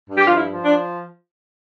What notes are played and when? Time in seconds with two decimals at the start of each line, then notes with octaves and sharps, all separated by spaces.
0.08 G2
0.18 G4
0.27 F3 F4
0.37 E4
0.51 F3
0.64 D4